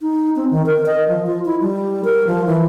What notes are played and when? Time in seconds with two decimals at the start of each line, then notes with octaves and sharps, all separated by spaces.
0.01 D#4
0.36 C4
0.51 D#3
0.66 A#4
0.86 D#5
1.08 F3
1.26 F4
1.45 E4
1.61 G3
2.04 A#4
2.27 F3
2.46 E3